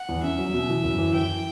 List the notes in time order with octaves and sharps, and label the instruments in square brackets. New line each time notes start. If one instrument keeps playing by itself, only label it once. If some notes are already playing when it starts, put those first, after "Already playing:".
Already playing: [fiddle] F#5
[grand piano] E2
[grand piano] C#4 [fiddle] E5
[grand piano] F#3
B2
E3
F#2
E3
[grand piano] E3 [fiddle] G5